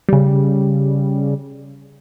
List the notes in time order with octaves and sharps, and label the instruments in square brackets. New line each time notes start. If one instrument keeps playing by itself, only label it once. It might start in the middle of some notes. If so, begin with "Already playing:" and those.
[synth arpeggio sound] C#3 G3